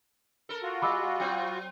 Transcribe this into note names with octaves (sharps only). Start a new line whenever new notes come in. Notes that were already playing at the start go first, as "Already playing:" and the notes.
A4 A#4
F4 F#4
G3 B5 D6 E6
F#3 C4